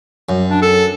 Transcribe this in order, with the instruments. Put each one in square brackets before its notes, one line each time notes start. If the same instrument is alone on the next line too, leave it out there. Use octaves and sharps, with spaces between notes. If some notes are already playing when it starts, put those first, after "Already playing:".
[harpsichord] F#2
[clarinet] D4
A4